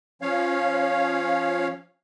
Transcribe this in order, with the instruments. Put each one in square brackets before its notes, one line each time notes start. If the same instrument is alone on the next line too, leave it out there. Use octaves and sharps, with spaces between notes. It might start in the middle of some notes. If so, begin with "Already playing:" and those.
[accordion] F3 C#4 C#5 F5